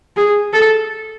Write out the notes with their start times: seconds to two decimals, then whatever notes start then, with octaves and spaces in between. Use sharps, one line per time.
0.17 G#4
0.53 A4